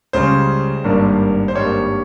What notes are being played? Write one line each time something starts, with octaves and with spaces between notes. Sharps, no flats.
C#2 C#3 G3 C#4 C5
G#1 G2 G3 A#3
C5
G#1 G2 G3 A#3 C#5